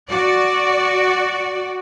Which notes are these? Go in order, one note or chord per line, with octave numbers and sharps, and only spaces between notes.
F#4 D5